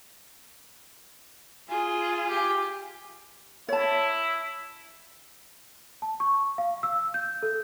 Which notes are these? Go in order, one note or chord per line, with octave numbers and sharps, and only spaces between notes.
F4 G#4 G#5
G4
E4 C#5 A5
A5
C#6
F5
E6
G6
A4